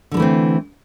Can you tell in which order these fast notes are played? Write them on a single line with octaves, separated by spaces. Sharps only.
D3 G#3 E3 A3 C4